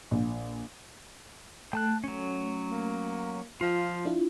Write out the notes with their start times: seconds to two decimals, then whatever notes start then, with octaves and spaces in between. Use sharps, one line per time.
0.11 A#1
1.73 A3 G5 A5 F#6
2.04 F#3 C#4
2.71 A#3
3.61 F3 F4
4.05 D4 E4 F4